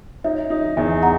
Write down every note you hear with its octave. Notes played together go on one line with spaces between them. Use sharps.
D#4 C#5 E5
D#4
E2 E5 G#5
F#5 A#5